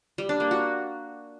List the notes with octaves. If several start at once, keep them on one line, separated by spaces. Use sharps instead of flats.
G3
D4
A#3
F#4